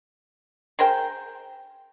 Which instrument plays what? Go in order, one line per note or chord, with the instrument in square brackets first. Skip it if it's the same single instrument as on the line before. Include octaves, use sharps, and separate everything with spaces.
[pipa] G#4 A#4 C5 G5